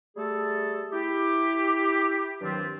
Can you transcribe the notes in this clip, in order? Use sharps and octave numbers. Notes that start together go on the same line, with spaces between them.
G3 A3 G#4 A4
E4 G4
G2 D#3 F#3 C4 F4